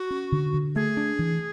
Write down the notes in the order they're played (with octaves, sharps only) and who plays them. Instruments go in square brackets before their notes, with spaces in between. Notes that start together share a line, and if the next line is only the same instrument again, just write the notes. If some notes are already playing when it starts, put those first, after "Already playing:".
Already playing: [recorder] F#4
[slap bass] C#4
D3
D3
[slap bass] A3 [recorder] G#4
[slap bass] D4
E3